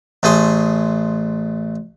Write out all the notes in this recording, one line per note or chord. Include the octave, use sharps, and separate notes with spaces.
A1 A3 G#4 C6